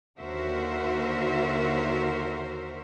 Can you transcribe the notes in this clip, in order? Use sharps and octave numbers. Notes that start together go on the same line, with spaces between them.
D#2 D3 F#4 A#4 C5 E5